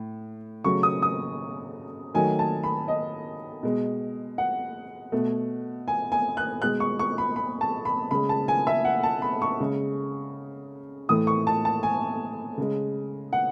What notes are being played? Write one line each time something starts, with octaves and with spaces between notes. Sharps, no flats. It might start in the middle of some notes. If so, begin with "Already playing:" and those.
Already playing: A2
C#3 F#3 A3 C#6
D#6
D#6
D#3 F#3 A3 G#5
A5
B5
D#5
B2 G#3
F#5
B2 A3
G#5
G#5
F#6
B2 G#3 F#6
C#6
C#6
B5
B5
A5
B5
C#3 G#3 B5
A5
G#5
E5
F#5
A5
B5
C#6
C#3 G#3
A2 E3 A3 D#6
C#6
A5
A5
G#5
C#3 G#3
F#5